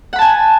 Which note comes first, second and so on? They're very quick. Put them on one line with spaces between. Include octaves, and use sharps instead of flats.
F#5 B5 A5 G#5